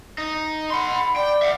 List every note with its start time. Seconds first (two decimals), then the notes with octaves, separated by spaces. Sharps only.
0.18 D#4
0.70 F#5 B5 C6
1.16 D5 G5
1.42 E5 F#5